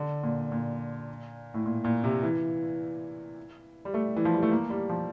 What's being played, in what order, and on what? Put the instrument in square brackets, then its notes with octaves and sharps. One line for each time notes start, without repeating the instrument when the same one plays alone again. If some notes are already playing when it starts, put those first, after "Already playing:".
Already playing: [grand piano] D3
A#2
A#2
A2
A#2
A#2
C3
E3
G3
A3
E3
F3
G3
A3
A#3
G3
F3